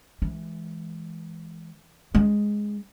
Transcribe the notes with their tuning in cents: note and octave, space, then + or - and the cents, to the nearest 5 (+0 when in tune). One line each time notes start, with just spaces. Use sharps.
E3 +0 G#3 +15
G#3 +0 C#4 +25